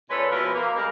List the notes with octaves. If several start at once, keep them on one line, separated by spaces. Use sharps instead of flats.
A#2 G#3 C#4 A4 B4 C#5
B2 F3 B3 E4 A#4 B4
A#3
C3 G3 G#3 A#4